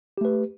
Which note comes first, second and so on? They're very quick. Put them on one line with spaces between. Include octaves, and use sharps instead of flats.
G4 A3 B4